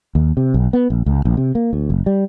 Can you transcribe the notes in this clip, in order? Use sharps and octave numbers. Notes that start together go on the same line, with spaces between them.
D#2
C3
B1
B3
A#1
C#2
A#1
C3
A#3
D2
F#1
G3